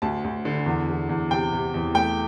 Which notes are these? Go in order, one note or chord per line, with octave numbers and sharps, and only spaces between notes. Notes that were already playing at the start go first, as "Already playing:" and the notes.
D2 A5
D2
D3
E2
E2
E2
C3 G5
C3
E2
A3 G5